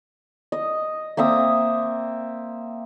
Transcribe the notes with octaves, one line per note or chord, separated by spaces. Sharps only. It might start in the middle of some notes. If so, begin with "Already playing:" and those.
D#5
A#3 C4 E5 D#6